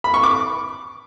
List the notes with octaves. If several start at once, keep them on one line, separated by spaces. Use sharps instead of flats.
B5
C#6
D6